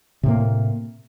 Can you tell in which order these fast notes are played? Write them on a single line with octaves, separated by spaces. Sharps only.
C3 A2 A#3